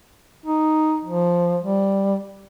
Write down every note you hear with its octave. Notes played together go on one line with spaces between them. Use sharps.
D#4
F3
G3